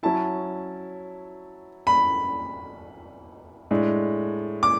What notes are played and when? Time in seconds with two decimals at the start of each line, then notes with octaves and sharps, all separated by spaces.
0.03 F#3 C#4 E4 A5
1.87 B5
3.71 A2 G#3 D4
4.63 D6